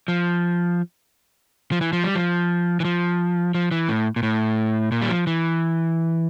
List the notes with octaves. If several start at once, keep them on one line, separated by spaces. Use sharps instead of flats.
F3
F3
E3
F3
G3
F3
E3
F3
F3
E3
A2
A#2
A2
A#2
G3
F3
E3